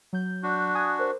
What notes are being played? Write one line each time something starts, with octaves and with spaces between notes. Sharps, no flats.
F#3 G6
D4 F#4
G#5 D#6 G#6
A#4 C5